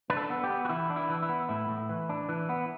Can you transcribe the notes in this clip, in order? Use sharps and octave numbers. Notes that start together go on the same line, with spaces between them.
D4 B4
A4
B3
G4
B3
F#4
E3 E4
D4
E4
E3
E4
B3
A2 E4
A2
E3
D4
E3
B3